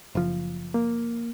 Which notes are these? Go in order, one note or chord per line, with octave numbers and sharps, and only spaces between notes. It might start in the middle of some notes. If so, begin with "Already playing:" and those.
F#1 F3
A#3